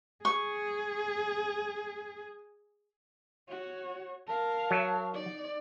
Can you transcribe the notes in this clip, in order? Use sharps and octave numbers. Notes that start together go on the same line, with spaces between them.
G#4 C#6
F#4 C#5
A#4 F5 A5
F#3
D#4 D5